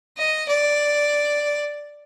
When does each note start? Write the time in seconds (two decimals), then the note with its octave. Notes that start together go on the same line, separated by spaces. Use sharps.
0.18 D#5
0.48 D5